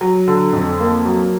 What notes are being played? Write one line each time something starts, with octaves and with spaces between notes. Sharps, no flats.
F#3
D3
F2
A#3
F#3